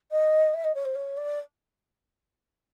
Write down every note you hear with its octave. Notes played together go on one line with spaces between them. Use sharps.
D#5
E5
D#5
C#5
C5
C#5
D5